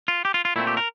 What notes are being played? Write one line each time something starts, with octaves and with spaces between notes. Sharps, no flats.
F4
G4
F4
F4
A#2 A3 C4 E4
G4
A#4